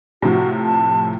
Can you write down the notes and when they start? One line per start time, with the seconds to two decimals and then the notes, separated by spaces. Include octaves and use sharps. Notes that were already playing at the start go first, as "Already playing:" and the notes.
0.22 A2 C3 F3 F#4
0.63 A5